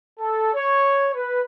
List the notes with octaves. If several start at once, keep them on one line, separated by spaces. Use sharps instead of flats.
A4
C#5
B4